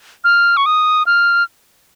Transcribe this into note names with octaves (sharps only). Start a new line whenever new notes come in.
F6
C#6
D#6
F6